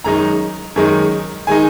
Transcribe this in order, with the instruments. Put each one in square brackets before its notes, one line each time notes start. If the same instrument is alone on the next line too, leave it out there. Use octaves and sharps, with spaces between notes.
[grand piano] F#2 D#3 G#3 D#4 A#5
F#2 D#3 G#3 D#4
D#3 G#3 D#4 G#5